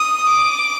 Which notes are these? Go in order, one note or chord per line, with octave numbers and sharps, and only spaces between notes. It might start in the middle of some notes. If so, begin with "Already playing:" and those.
Already playing: D#6
D6